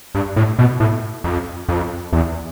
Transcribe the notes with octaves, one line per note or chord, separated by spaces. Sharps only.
G2
A2
B2
A2
F2
F2
E2